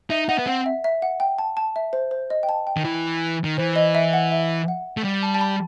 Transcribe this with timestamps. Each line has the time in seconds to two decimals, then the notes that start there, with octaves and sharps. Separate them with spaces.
0.10 D#4 E5
0.29 D#4 F#5
0.39 B3
0.47 C4 F#5
0.66 E5
0.84 E5
1.02 F#5
1.20 G5
1.39 A5
1.57 A5
1.76 E5
1.93 C5
2.11 C5
2.30 D#5
2.43 G5
2.49 A5
2.67 G5
2.77 D#3
2.85 E3
3.44 D#3
3.58 E3 C5
3.76 D#5
3.95 E5
4.13 F#5
4.32 E5
4.68 F#5
4.97 A3
5.04 G3
5.23 A5
5.35 A5
5.41 B5